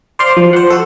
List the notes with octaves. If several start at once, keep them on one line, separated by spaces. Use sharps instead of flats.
C5 D5 F5 C6
F3
C5 F#5
F#4 A4